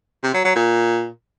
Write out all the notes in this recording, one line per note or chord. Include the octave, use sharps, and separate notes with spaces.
C3
F#3
F#3
A#2